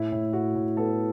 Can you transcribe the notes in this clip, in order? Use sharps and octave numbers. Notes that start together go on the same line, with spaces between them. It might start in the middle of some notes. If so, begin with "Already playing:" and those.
Already playing: A2 E4
A2
A2 F#4
A2
B3 A4